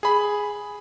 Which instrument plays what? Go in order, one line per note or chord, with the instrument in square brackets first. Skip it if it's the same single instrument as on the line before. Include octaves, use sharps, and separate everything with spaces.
[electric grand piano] G#4 B5